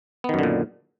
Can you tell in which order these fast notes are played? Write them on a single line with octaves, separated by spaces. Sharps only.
B3 D#3 F#2 D3 A#2